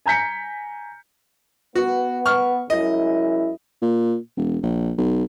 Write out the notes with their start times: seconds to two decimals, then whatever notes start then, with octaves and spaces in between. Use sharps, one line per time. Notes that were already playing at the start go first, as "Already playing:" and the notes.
0.06 G#5 A#5 G6 B6 C#7
1.75 B3 F#4
2.26 C#6 F6
2.70 F#2 G#3 E4 D#5
3.82 A#2
4.37 E1
4.63 A#1
4.98 B1